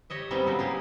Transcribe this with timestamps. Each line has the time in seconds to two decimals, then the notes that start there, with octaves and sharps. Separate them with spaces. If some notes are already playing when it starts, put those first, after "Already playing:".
0.10 G4 C#5 D#5 E5
0.31 E3 G3 B3 C4 D#4 E4
0.46 C#3 F#3 D#4
0.58 A#3 D#4 G4 G#4 A#4